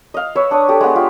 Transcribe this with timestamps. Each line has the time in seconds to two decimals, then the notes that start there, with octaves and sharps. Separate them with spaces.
0.14 D#5 F5
0.35 B4 C#5 E6
0.51 D4 C#5 D#6
0.69 G4 A4
0.81 G#3 B3
0.95 F4 G4